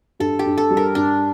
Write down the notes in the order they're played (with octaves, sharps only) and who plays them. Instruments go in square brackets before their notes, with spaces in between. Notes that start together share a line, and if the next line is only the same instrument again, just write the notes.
[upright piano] G2 [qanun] A4
[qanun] G4
[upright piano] G2
[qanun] A4
[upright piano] G3
[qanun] A#4
[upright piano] G2 [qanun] D4